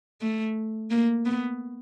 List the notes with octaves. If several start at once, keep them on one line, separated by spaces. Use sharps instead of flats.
A3
A#3
B3